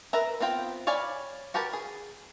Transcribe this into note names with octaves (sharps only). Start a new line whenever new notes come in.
A#4 B4 E5 A#5
B3 C4 F4 G5
C#5 D5 F5 G#5 B5
F#4 G4 A#4 B4 A5
G#4